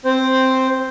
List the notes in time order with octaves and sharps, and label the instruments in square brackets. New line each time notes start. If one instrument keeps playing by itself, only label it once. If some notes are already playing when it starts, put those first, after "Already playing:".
[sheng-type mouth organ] C4 C5